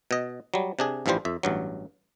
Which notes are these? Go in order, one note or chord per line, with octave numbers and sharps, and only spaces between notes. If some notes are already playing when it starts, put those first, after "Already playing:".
B2 D#5
F#3 G3
C3 D4 G#4
A1 G2 E3 F3 G3 C5
F2 E5
A1 G2 F#3